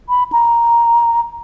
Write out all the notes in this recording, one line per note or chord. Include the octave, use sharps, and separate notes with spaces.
B5
A#5